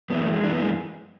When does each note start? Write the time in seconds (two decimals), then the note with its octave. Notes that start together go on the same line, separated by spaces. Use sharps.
0.10 F#2 E3 B3
0.22 A3
0.32 G#3
0.44 F#2 E3 D4
0.52 B3
0.61 G#3